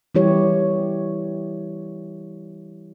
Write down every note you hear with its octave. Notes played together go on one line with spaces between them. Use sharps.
E3 G3 E4 G4 C#5